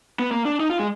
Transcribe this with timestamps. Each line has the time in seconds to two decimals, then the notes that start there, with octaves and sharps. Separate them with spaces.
0.19 B3
0.31 A#3
0.45 D4
0.60 D#4
0.70 F4
0.79 G#3